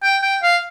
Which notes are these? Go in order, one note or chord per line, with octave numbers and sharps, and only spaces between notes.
G5
G5
F5